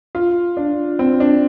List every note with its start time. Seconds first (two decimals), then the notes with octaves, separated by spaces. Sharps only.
0.15 F4
0.57 D4
0.99 C4
1.20 D4